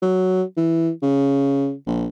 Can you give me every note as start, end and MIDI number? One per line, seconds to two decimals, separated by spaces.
0.02 0.43 54
0.57 0.90 52
1.02 1.73 49
1.87 2.07 34